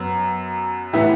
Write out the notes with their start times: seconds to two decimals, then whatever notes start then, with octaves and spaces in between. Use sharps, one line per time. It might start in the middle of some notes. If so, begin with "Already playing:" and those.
Already playing: F#2 F#3 B3
0.93 A2 E3 B3 E5